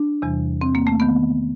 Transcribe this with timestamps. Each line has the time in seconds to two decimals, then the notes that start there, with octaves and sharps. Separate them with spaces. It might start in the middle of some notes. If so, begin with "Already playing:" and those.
Already playing: D4
0.22 E2 C3 E3 G3
0.61 C4
0.75 A#3
0.87 A3
1.00 D#3 B3